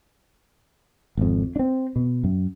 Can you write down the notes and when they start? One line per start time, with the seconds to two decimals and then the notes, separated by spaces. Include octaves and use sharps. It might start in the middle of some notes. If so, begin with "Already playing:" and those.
1.17 G#1 F2
1.56 C4 D4
1.96 B2
2.24 F#2